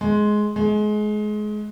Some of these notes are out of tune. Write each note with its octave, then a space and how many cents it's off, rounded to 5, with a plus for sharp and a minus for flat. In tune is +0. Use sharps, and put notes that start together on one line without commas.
G#3 +10
G#3 +25